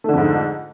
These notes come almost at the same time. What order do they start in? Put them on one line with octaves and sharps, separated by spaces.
A3 D3 F2 G#2